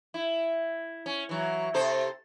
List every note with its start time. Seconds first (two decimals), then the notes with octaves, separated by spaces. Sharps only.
0.14 E4
1.06 C#4
1.29 E3 F#3
1.74 C3 A4 C5